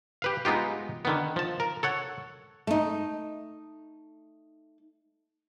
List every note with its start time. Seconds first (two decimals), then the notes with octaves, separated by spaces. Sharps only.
0.22 G4 B4 F5
0.45 G#3 B3 D#4 F4 G4
1.05 D3 D#3 B3
1.36 F3 A5
1.60 A#4
1.83 A4 C#5 F#5
2.67 A3 D#4